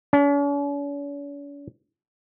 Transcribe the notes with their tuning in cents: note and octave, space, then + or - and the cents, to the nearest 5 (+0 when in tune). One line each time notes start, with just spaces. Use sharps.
C#4 +45